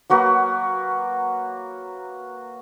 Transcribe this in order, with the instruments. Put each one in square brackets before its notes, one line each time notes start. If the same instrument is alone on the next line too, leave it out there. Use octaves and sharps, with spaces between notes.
[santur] F#3 A#3 F#4 B4